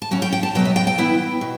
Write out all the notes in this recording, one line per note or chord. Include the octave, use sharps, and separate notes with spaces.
A5
F#3 C#4 E4 G5
G5
G5
A5
B2 F#3 B3 G5
E5
G5
G5
E3 B3 E4
B2